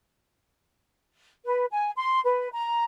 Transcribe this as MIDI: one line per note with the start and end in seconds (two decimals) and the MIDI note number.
1.46 1.65 71
1.71 1.91 80
1.96 2.21 84
2.26 2.49 71
2.53 2.84 82